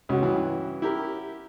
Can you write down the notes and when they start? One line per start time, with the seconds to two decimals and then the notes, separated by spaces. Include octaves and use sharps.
0.09 C#2 C#4 F#4
0.22 G2 E3
0.82 E4 G4 A#4